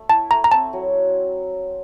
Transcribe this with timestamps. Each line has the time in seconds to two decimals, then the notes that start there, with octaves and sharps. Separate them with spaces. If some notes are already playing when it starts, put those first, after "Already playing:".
Already playing: A3
0.10 E4 A5
0.31 A3 A#5
0.44 A#5
0.52 C4 A5
0.73 F#3